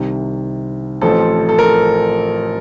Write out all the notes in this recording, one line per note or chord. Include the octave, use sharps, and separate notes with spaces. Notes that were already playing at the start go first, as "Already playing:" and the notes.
Already playing: C2 C3 D#3
A1 A2 F3 C4 A4
A4
A#4